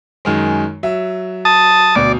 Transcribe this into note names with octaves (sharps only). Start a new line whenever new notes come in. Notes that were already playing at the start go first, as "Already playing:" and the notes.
F#2 D#3 G#3
F#3 E5
A5 D#6
D2 B2 D5